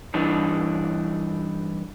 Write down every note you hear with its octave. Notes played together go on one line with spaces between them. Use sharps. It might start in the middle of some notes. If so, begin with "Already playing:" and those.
G2 E3 D4 D#4